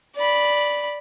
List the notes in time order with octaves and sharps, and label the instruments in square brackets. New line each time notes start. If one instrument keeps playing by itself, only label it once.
[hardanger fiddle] D5 B5